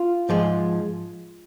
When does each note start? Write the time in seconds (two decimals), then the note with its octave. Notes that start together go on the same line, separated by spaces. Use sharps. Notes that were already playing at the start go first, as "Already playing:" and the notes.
Already playing: F4
0.29 G#2 F3 G#3